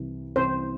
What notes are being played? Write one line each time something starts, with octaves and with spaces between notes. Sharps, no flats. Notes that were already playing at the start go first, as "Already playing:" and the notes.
Already playing: C2 C3 E3
C2 C3 E3 C5